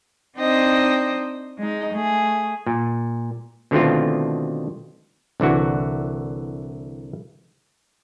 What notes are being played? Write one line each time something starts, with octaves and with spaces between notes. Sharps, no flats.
C4 D4 D#4 C5 D#5 G5
G#3 D#4
A3 G#4
A#2
B2 D3 D#3 A3 C4 F4
C2 D3 E3 F#4